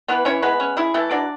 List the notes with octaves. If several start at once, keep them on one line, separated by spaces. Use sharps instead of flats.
E3 B3 B4
E3 C#4 C#5
G#3 B3 B4
C#4
E4 G#4
E3 A3 A4
F#3 D4 D5